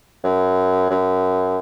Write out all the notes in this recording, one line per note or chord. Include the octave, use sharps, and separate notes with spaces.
F#2
F#2